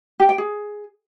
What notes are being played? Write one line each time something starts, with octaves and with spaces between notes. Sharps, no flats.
G4
G5
G#4